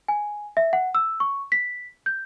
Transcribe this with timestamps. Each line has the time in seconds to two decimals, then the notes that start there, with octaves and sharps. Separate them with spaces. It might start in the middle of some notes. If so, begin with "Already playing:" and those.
0.08 G#5
0.57 E5
0.73 F#5
0.95 E6
1.20 C#6
1.52 B6
2.06 G6